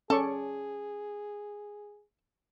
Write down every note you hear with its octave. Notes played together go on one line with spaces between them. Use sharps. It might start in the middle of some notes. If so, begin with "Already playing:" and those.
C#4 G#4 A4 D5 C#6